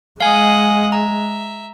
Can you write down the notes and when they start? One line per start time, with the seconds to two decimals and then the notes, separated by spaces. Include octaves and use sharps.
0.21 G#3 D#5 F5 F#5 G#5
0.92 E5 A#5